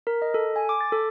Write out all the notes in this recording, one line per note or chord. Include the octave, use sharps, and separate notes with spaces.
A#4
D#5
A4
G#5
D6
A6
A4